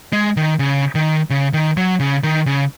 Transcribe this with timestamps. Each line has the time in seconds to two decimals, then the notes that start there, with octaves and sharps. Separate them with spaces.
0.13 G#3
0.37 D#3
0.59 C#3
0.95 D#3
1.30 C#3
1.53 D#3
1.77 F#3
2.00 C#3
2.23 D#3
2.46 C#3